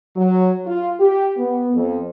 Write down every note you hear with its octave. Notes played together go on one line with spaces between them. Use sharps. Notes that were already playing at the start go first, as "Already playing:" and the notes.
F#3
F4
G4
B3
F2